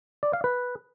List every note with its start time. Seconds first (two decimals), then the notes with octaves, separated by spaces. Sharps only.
0.23 D5
0.33 F5
0.44 B4